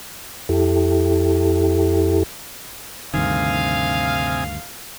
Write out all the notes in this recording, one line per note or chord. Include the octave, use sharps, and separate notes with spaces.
F2 E4 G4 A4
D2 G2 C3 D#3 F5 G#5 D#6